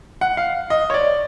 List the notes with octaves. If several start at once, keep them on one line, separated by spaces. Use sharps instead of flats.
F#5
F5
D#5
C#5
D5